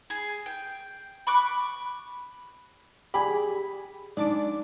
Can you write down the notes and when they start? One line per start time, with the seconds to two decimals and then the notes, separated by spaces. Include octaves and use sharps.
0.10 G#4
0.46 G5
1.27 B5 C#6 D6 F#6
3.14 G4 G#4 B5
4.17 G#2 D4 D5 A5 D6